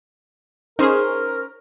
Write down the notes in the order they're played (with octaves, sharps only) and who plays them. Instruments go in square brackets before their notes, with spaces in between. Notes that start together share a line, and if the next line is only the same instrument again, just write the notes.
[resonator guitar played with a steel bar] C#4 C5 [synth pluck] D#4 G#4 [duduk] A#4